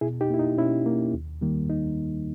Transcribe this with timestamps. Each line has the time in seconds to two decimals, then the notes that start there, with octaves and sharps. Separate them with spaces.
0.01 B2 E4 G#4
0.21 D#4 G4
0.30 A#3 E4
0.39 D#4
0.58 B2 C#4 E4
0.86 A#3
1.14 D#2
1.41 D#3 G3 A#3
1.70 D#4